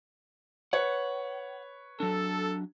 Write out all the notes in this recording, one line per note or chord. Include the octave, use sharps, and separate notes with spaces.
B4 C#5 F#5
F#3 D4 A4